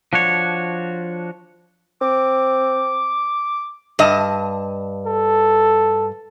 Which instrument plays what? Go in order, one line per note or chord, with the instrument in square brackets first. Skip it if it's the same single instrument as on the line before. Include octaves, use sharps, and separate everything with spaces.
[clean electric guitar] F3 D4 F#4 C#5
[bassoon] C4 [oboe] D6
[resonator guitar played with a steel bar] G2 D#5 A5
[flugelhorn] A4